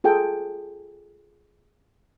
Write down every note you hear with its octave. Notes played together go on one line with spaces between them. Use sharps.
F4 G#4 A4 G5 G#5